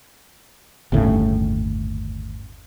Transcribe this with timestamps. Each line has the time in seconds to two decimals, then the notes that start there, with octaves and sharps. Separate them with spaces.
0.92 G1 D#2 A2 C#3